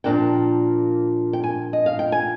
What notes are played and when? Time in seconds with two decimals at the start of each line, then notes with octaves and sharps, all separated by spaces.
0.04 A#2 F3 A#3 D4 G5
1.33 G5
1.44 G#5
1.73 D#5
1.86 F5
1.99 G5
2.12 G#5